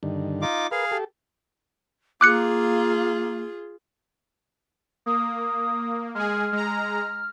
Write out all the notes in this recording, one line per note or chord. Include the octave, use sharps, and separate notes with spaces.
G2 D3 D#3
D#4 F4 D6
G#4 A#4 B4 F5
G4 A4
A#3 F4 G#4 D6 F#6 C#7
A#3 D#6
G#3 G#4 F6
G#3 A#5